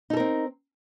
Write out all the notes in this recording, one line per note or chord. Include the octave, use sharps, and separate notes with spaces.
C4 D#4 A4 A#4